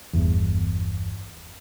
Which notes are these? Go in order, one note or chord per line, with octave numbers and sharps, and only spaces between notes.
G1 E2